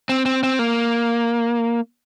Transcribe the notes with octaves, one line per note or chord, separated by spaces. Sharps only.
C4
C4
C4
A#3